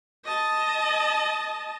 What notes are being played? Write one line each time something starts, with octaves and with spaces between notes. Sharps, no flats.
D#5 A5